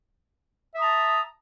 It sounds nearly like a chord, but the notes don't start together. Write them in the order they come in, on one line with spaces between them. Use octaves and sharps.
E5 D#6 A#5 A5